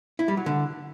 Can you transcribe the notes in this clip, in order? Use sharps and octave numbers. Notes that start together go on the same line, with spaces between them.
E4
G3
F#3
D3